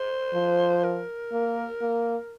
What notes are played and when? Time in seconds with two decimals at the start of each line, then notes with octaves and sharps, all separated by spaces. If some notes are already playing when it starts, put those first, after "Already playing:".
Already playing: C5
0.34 F3
0.84 A#4
1.32 A#3
1.81 A#3